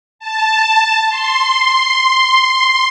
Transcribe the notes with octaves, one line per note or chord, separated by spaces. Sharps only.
A5
C6